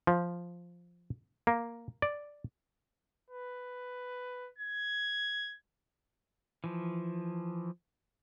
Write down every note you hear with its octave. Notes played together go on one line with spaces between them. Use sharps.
F3
A#3
D5
B4
G#6
E3 F3